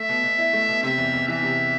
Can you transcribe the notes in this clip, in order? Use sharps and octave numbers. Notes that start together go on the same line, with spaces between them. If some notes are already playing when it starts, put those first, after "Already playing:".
Already playing: A3 E5
B2
B2
E4
A3
B2
C3 E5
E2
E2
E3 E5
C3